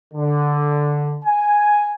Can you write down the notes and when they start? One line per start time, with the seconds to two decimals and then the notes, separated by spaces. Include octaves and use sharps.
0.14 D3
1.25 G#5